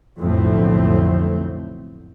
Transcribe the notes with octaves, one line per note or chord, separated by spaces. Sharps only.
B1 F2 A2 D3 A3 C4